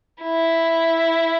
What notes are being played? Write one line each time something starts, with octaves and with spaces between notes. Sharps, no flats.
E4